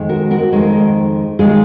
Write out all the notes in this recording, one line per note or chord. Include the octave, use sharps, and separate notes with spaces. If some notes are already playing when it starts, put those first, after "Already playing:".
Already playing: F2 D#3 G#3
F#4 A#4
F#4 A#4
F2 D#3 G#3
D#3 G#3 F4 G#4